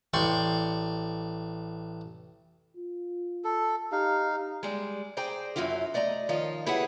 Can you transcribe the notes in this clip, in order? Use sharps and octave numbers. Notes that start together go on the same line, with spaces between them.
A1 D5 G5 C6 C#6
F4
A4
D#4 G4 F5
G3 G#3
G#4 C5 D5 G5 A#5
F#2 F#3 E4 F4 F5
A3 D5 D#5 F5 A#5
D#3 F3 C#5 D#5 F5
E4 G4 G#4 B4 C#5 F#5